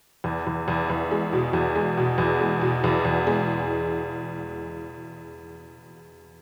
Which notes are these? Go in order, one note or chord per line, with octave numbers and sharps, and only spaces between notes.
E2
E2
E2
E2
G#3
B2
E2
G#3
B2
E2
G#3
B2
E2
E2
G#3